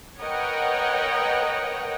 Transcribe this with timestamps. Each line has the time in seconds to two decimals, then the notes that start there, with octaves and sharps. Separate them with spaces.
0.21 A#4 B4 C#5 D#5 F#5 G5